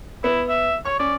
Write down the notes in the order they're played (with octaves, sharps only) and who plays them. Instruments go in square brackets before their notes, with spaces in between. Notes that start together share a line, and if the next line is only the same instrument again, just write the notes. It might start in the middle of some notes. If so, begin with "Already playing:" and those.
[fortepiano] B3 [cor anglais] E4
[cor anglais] E5
[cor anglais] C#5 [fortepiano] C#6
[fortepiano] C#4 [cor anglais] D5